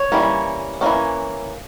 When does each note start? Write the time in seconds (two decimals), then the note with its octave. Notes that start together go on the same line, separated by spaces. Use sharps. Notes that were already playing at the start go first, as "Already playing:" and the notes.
Already playing: C#5
0.12 E3 G3 A#3 C#4
0.81 E3 G3 A#3 C#4